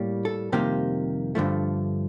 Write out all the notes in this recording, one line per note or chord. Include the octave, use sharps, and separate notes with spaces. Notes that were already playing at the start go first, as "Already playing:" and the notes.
Already playing: A2 G3 A#3
A4
F2 C3 D#3 G3 A#3 G4
G2 D3 F3 A3